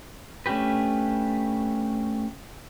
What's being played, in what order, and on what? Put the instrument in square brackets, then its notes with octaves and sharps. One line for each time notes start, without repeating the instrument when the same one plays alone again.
[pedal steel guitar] A3 C#4 D4 G4 B4